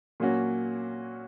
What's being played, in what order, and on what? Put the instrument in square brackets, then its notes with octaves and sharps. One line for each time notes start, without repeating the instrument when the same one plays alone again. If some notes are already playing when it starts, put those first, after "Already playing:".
[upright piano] A#2 F#3 A#3 C#4 F#4